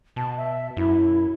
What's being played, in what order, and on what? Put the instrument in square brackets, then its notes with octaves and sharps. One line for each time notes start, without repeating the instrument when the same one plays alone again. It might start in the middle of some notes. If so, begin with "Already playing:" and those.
[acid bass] B2 [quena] A5
[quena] E5
[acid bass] F#2 [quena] E4